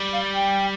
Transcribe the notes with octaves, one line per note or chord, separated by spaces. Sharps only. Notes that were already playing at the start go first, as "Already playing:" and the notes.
Already playing: G3
F5
G5